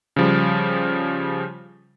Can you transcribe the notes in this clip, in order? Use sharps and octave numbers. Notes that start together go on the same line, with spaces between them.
C#3 F3 G3